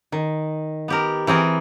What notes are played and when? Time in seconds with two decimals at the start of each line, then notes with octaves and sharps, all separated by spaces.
0.12 D#3
0.88 B3 G4 A#4
1.27 E3 C4 G#4 A#4